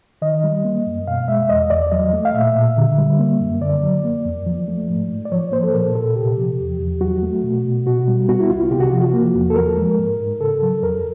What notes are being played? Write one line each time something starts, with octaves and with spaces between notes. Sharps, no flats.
D#3 D#5
G3
A#3
F#2
B2 F5
G#3 E5
E2 D#5
E2 D5
F#3 D#5
A3
F5
A#2 E5
A#2
D3
G3
A#3
F#2
D3 D5
F#3
A#3
F2
F3
A3
G#2
G#2
D5
F3 C#5
A#3 C5
A4
A#2 A#4
A#2 A4
C3 G4
F3
E2
E2
F#3 F#4
A3
B2
B2
B2 F#4
G3
B3 F#4
E4
C2 F4
C3 G4
F#4
F3 F4
F#4
A#3
E2
A4
F3 A#4
G#3
G#2
G#2
C#3 A4
F#3
F2 A#4